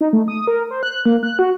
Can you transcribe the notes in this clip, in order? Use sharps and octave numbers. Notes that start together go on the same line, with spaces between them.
D#4
A3
D#6
A#4
C5
F#6
A#3
F#6
F#4